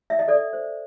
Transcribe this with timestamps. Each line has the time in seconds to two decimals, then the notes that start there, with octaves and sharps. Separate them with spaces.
0.10 E5
0.19 D#5
0.28 A4 D5
0.53 C5